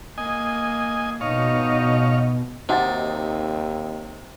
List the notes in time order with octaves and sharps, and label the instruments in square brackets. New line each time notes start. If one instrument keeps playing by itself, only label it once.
[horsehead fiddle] A#3 [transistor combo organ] D#5 G#5
[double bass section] B2 [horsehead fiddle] D#4 D#5 [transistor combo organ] C#5 F5
[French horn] D#2 [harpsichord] C3 [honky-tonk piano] D#4 A6 [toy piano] F#4 F#5 G#5